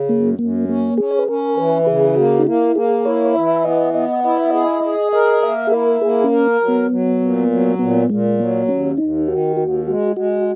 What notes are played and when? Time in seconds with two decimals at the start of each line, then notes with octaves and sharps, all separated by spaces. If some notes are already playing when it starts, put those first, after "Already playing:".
Already playing: C#3
0.09 F#2 A#3
0.39 F#2 A#3
0.68 A#3 C#4
0.97 C#4 G#4
1.11 C#5
1.19 B4
1.28 C#4 A#4
1.57 E3 B4
1.87 C#3 G#4
2.16 A#3 F#4
2.39 D#4
2.46 A#3 E4
2.75 A#3 G#4
3.05 E4 C#5
3.35 E3 E5
3.64 B3 D#5
3.94 B3 D#5
4.24 E4 D#5
4.37 E5
4.50 G#4 D#5
4.84 G#4
5.13 A#4 D#5
5.42 A#3 E5
5.67 G#4
5.72 E4 A#4
6.02 A#3 G#4
6.24 C#4
6.32 A#4
6.61 F#3
6.68 B3
6.91 F#3
7.20 A#2
7.50 F#3
7.79 A#2 B3
8.09 A#2 G#3
8.39 F#3 A#3
8.68 D#2 C#4
8.98 D#2 D#4
9.28 D#3 F#4
9.57 D#2 F#4
9.87 G#3 F#4
10.16 G#3 F#4